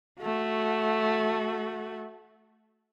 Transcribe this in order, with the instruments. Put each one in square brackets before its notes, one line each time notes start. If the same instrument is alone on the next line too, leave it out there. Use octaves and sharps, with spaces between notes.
[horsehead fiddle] A3 F#4